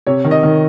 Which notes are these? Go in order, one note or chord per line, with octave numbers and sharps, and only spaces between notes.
C3 C#5
D#3
D#5
D#3